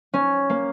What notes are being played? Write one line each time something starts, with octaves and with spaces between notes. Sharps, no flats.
C#4
A#3